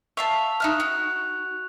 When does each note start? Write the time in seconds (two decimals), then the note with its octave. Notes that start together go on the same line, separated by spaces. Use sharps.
0.17 E5 F5 A5 C#6 F7
0.60 D#4 E5 F6 F#6
0.80 F#4